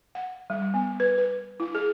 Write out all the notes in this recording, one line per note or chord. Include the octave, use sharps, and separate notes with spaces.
F#5
G3
B3
B4
B4
E4
G#4